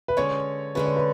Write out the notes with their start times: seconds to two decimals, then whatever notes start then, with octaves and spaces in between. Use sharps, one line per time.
0.08 B4
0.17 D3 G#3 C#4 C#5
0.75 D3 G#3 C#4 B4
0.86 C#5
0.96 B4